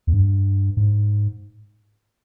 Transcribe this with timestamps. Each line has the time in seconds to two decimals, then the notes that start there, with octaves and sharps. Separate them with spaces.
0.07 E2
0.12 G2
0.77 G#2